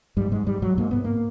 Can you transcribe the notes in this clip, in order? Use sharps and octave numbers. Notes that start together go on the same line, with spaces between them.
G#2 G3
G#2 G#3
G#2 G3
G#2 F#3
G#2 A#3
G#2 B3
A#3